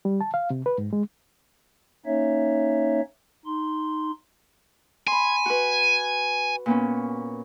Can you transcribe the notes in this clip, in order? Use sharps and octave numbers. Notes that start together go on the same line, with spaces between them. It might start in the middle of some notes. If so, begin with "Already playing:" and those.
G3
A5
F5
C3
B4
G#2
G#3
A#3 C#4 D#4 C#5 E5
D#4 C6
G#5 B5 C6
F#4 B4
A#2 B3 C#4